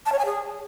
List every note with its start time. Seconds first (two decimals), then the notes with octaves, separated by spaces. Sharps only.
0.06 A5
0.12 C#5
0.19 G#5
0.25 G#4